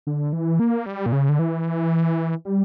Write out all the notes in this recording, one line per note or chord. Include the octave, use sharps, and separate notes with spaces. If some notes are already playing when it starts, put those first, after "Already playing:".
D3
E3
A#3
G3
A#2
C#3
D3
E3
G3